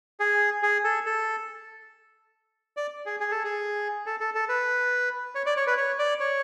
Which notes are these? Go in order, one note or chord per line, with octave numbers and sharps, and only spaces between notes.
G#4
G#4
A4
A4
D5
G#4
G#4
A4
G#4
A4
A4
A4
B4
C#5
D5
C#5
B4
C#5
D5
C#5